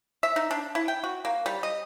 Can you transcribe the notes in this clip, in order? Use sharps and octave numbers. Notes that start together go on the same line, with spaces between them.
E5
D#4
D4
E4
G5
F#4
A#3
G3
D#5